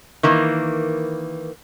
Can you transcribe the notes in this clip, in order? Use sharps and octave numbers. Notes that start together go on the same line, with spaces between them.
D#3 E3 A#3